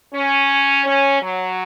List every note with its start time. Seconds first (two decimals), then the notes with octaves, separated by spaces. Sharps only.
0.14 C#4
0.86 C#4
1.22 F#3